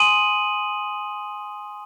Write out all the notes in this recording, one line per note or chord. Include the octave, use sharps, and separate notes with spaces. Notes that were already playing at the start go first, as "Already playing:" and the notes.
Already playing: G#5 C6 D#6 D#7 F#7